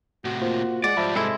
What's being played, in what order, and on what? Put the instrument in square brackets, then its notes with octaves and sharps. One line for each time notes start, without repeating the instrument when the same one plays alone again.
[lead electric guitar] A2 C3 [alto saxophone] F#4
[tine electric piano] A#3 F4 C5
[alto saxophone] G#3 [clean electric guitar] D5 [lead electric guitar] F#5
[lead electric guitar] G#2 G3 [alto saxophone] F3 [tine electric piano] E5 A5 B5
[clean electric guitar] C3 G#3 E4 [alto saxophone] A4